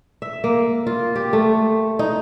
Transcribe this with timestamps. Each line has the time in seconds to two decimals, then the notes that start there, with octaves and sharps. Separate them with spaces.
0.22 E5
0.44 A#3
0.87 F4
1.15 G4
1.33 A3
1.99 D#4